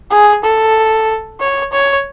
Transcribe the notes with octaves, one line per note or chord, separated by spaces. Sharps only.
G#4
A4
C#5
C#5